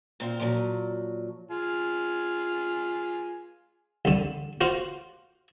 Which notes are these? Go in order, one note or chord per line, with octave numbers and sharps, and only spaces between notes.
A#2 C4 F4
A#2 F3 F#3
F4 G#4 G#5
C2 D3
F4 F#4 C5 F5